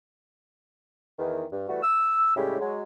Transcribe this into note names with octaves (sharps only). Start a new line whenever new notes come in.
E2 D#3 E3
G2
E3 G3 A3 F#4
E6
A2 C#3 G3 G#3 E4 G4
F#3 G#3